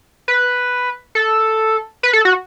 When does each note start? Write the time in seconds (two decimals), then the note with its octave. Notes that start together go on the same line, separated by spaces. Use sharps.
0.28 B4
1.15 A4
2.03 B4
2.13 A4
2.25 F#4